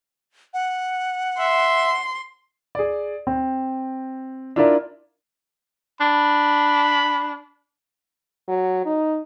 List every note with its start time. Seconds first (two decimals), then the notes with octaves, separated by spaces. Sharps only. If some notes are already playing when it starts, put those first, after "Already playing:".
0.54 F#5
1.39 E5 C6
2.75 G#4 D5
3.27 C4
4.56 D4 E4 F4 A#4 D5 E5
6.01 D4 B5
8.48 F#3
8.85 D#4